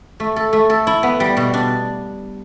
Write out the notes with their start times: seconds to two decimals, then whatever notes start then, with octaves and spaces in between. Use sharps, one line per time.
0.20 A3
0.36 A4
0.53 A3
0.70 A4
0.87 E4
1.03 B3
1.20 G3
1.37 B2
1.54 D4